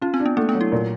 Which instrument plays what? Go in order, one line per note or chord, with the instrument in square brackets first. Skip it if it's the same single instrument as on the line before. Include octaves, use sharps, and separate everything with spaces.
[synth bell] C#4 [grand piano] F4
[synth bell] C4
[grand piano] D4
[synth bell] B3
[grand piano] A3 [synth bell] A#3
[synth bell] B3
[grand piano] F#3
[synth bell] E4
[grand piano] A#2